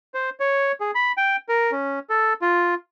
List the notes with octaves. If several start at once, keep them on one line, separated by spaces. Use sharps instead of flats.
C5
C#5
G#4
B5
G5
A#4
C#4
A4
F4